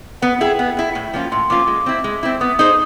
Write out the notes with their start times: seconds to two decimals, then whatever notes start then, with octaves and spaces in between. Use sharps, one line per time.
0.22 B3 F#5
0.41 E4 G#4 G5
0.59 B3
0.77 E4 G#4
0.95 A2
1.14 F3 A#3 C#4 F4
1.32 A2 C6
1.50 F3 A#3 C#4 F4 D6
1.67 G#3
1.86 C4 E4
2.04 G#3
2.23 C4 E4
2.41 B3 D#6
2.59 D#4 G#4 C5 D#6